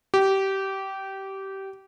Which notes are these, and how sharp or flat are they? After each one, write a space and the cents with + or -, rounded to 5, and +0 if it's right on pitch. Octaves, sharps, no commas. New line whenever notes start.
G4 -20